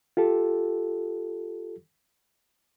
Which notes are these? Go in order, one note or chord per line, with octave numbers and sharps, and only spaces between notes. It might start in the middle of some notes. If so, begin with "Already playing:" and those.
F4 G4 A4